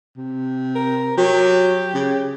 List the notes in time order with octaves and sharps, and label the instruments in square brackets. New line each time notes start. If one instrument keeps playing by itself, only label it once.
[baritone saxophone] C3
[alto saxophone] A#4
[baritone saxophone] F#3 [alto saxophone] G4
[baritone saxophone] C#3